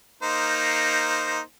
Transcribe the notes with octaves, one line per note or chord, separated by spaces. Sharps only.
A#3 D#4 C5